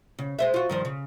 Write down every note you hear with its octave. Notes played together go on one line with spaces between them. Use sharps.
C#3
G#3 C5 E5
F4 F#4
G2 D#3 F3
C#3